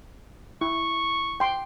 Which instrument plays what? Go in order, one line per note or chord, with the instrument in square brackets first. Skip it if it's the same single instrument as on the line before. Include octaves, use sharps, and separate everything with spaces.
[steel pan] E4 [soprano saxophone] C#6
[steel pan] G5 C6